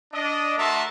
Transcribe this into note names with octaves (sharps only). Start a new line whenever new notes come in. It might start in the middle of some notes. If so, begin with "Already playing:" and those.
D4 D#5
A3 F#4 A#4 E5 A5 C6